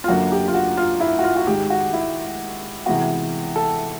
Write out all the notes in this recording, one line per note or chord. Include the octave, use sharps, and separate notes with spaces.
F4
F#2 D3 F#3 A#3 F#4
G4
F4
F#4
F4
E4
F#4
F4
F#4
G#2 D#3 G#3 G4
F#4
E4
C3 E3 G#3 B3 F#4
A4